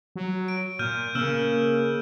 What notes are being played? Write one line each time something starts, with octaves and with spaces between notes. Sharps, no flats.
F#3
D7
A#2 F6 G6 D#7
C#3 A#3 E6 F6 E7